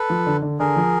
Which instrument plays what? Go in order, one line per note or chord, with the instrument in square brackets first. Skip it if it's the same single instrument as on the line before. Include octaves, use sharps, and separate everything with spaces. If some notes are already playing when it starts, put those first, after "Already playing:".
Already playing: [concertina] A4 B4
[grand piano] F3
D3
D3
[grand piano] D3 [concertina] G#4 A#4
[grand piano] F3